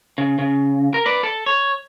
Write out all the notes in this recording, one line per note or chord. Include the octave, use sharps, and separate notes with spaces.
C#3
C#3
A#4
B4 D5
A4
C#5